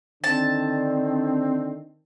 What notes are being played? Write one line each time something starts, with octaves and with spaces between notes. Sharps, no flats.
D3 D#3 C4 D4 A5